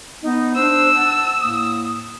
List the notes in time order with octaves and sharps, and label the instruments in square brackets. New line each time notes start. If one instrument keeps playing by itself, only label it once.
[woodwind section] B3 D#4
[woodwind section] D4 C5 [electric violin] E6
[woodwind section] F#5 A5
A2 A#3 D#6